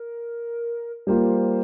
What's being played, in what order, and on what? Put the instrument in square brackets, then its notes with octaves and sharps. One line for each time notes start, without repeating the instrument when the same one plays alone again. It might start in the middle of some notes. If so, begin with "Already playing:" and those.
Already playing: [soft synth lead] A#4
[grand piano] G3 A#3 F4 [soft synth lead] C5